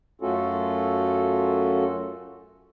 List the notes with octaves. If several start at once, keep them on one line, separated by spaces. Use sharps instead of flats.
F#2 A3 C#4 F4 F#4 A4